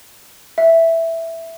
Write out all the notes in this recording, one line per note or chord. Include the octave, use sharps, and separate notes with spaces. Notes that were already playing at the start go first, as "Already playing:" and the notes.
E5